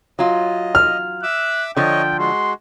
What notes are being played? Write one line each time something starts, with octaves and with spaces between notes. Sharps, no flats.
F#3 F4 D#5
F6
E5 D6 E6 F#6
D3 F3 C#5 D#5 G5
G#3 F#4 C6